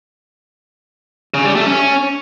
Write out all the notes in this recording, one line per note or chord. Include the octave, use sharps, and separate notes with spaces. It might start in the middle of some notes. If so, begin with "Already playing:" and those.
C#3
G3
A3
C#4